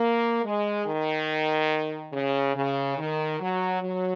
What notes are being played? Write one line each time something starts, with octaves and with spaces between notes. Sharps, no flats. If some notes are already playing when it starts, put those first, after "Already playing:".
Already playing: A#3
G#3
D#3
C#3
C#3
D#3
F#3
F#3